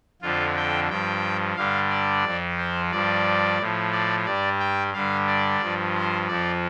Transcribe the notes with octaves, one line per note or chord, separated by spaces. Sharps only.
F2 D3 F3 F4
G5
G2 F3 G5
G2 D3 G3 F5
D5
F2 F3
C5
G2 F3 D5
A2 F3
D5
G2 G3 D5
G5
G2 D3 G3 F5
D5
G2 F3
C5
F2 F3 D5